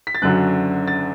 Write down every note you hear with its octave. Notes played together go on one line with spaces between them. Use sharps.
B6
A6
F#1 F#2 D3 F#3 F#6
A6